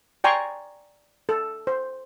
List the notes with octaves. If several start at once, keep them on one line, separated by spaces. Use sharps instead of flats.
D5 G5 G#5 A#5 C6 C#6
A4
C5